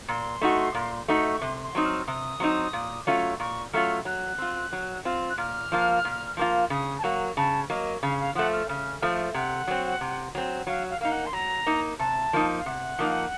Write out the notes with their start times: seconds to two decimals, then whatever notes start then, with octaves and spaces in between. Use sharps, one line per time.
0.08 A#2 C6
0.41 A3 D#4 F#4
0.75 A#2
1.08 A3 D#4 F#4
1.34 C#6
1.41 C3 C6
1.64 C6
1.75 F#3 C4 D#4
1.85 F6
2.07 C3 D#6
2.40 F#3 C4 D#4
2.73 A#2
3.07 F#3 A3 C#4 F4
3.40 A#2 C#6
3.73 F#3 A3 C#4 F4 F6
4.05 F#3 F#6
4.38 C4 F4
4.73 F#3
5.05 C4 F4
5.30 F#6
5.38 A#2 F6
5.72 F3 A#3 F4
6.05 A#2
6.37 F3 A#3 F4
6.70 C#3 D#6
6.98 A5
7.03 F#3 A#3 F#5
7.37 C#3 A5
7.70 F#3 A#3 D#5
8.02 C#3 F5
8.20 F5
8.35 F3 A3 F#5
8.53 F6
8.69 C#3 F6
9.02 F3 A3 F6
9.34 C3 F#5
9.68 F#3 C4
10.01 C3
10.35 F#3 C4
10.67 F#3 F5
10.90 F5
11.01 A#3 D#4 F5
11.11 F#5
11.26 C6
11.33 F#3 A#5
11.66 A#3 D#4
11.99 C3 A5
12.33 F3 A#3 D#4
12.58 F5
12.66 C3 F#5
12.99 F3 A#3 D#4